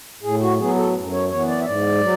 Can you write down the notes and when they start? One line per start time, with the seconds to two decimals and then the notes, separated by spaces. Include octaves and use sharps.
0.23 A2 G#4
0.41 F#4
0.58 F#3 B3 G#4
0.76 A4
0.94 F#2
1.12 C#5
1.30 E3 B3 C#5
1.47 D5
1.61 E5
1.65 G#2 D5
2.01 F#3